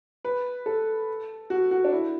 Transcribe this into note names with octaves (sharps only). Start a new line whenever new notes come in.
B4
A4
F#4
F#4
D4
E4